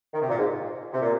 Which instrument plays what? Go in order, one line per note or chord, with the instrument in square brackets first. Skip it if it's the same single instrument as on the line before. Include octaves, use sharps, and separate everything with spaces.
[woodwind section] D#3
C3
A#2
G#2
C3
A#2